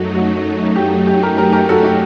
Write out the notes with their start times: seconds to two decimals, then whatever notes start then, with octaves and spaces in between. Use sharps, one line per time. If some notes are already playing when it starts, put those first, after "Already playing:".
Already playing: F#2 F#3 A3 D#4 F#4
0.15 F#4
0.76 G4
1.07 G4
1.23 G4 A#4
1.38 G4 A#4
1.53 G4 A#4
1.69 F#4 A4
1.84 G4